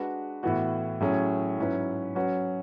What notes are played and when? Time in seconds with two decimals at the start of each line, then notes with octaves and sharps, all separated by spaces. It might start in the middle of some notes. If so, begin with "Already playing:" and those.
Already playing: G#3 D4 F#4 B4
0.43 A2 E3 B3 F#4
1.00 A2 F#3 C#4 G#4
1.58 G#2 F#3 C#4 E4 B4
2.15 F#3 C#4 F#4 B4